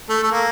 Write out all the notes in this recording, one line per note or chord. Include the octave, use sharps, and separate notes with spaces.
A3
A3
A#3